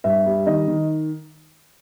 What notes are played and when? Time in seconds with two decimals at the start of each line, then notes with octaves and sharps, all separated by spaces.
0.04 G2 E5
0.26 G3
0.46 D#3 D#5
0.68 D#3